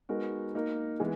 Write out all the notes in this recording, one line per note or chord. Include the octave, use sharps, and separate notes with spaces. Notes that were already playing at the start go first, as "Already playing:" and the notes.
G#3 B3 D#4 F#4 A#4
A#3 D#4 A#4
E3 G#3 B3